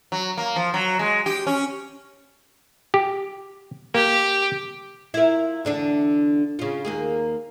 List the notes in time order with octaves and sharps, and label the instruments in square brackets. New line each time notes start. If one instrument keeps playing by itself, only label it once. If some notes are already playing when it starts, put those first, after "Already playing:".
[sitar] F#3
A#3
F3
F#3
G#3
G4
C#4
[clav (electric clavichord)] G4
[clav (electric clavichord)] A#3 [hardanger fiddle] G4
[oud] E4 F4 A#4
E2 D3 D4
C#3 F4
D#2 A#3 G#4